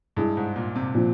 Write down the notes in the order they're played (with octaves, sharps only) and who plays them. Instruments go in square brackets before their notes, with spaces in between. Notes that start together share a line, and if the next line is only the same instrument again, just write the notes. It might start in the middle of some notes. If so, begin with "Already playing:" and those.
[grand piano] G2 [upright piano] G#3 E4 G#4
[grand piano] G#2
A#2
C3
[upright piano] A#2 F3